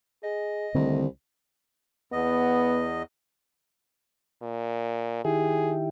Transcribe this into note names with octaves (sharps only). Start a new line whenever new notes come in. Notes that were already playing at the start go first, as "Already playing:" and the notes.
G#4 D#5
C2 D3 D#3 A3 C4
E2 B3 D#5
A#2
D#3 E4 G4 G#4